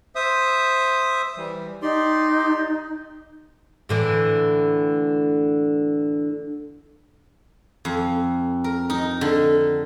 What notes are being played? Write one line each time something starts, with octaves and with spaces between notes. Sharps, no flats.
C5 E5 D#6
E3 G3
D#4 G4 D5 C6
A2 D3 E3
F2
A#4
D#4
D3